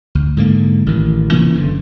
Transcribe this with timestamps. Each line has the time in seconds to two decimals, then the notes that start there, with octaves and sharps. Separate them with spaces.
0.15 D2
0.37 G#2 D3 A#3
0.86 A1 D#3
1.32 C3 E3 A#3 C#4
1.55 F#1 D3 E3